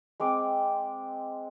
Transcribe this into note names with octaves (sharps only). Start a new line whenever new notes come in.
G#3 C4 D6